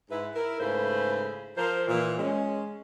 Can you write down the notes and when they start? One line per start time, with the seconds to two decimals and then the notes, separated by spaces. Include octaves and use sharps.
0.10 G#2 E4 B4
0.35 E4 A#4
0.60 G#2 C#3 A3 E4 B4 C5
1.57 F3 A#4 C5
1.87 A#2 E3
2.18 G#3 C#4